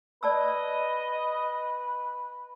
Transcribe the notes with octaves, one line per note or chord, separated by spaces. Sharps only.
B4 D5 D#5 A5 E6